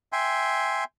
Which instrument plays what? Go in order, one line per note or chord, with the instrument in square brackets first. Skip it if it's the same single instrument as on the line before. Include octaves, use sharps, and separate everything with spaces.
[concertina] E5 G5 G#5 C6